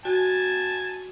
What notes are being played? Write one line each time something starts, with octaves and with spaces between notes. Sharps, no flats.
F#4 G#5 A5